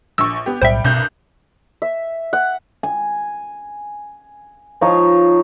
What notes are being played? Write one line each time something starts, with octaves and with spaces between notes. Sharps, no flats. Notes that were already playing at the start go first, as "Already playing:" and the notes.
A#1 C#6 E6
B3 G4
B1 A2 G3 C5 E5 G5
C2 G2 B2 D4 G6
E5
F#5
G#5
F3 D#4 F4 C#5